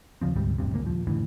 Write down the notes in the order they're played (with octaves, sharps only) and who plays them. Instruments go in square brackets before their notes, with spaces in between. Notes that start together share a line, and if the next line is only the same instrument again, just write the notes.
[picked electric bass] D#2 C#3 F3 C4
D2 G#2 C3 G3
E1 A1 G2 C3
G1 C#2 C3 A#3
D#1 D#2 F3
F2 A2 D3 E3